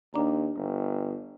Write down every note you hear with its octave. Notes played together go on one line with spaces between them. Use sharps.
D#2 D4 D5 A#5
G1